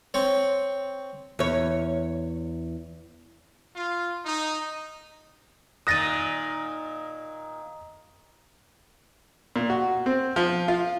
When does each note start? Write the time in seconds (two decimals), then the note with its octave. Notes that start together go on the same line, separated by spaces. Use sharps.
0.14 C4 C#5
1.39 E2 C#5
3.75 F4
4.25 D#4
5.87 A#2 D#3 D#6 F#6 A6 A#6 D#7
9.56 A#2
9.70 F#4
10.06 C4
10.36 F3
10.68 F4